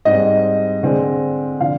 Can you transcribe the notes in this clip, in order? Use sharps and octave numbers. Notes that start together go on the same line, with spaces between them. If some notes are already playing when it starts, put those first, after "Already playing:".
G#2 G3 C4 D#5
D3 G#3 C4
D3 F3 F5